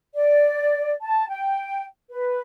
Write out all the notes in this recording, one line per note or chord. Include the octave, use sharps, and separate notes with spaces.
D5
A5
G5
B4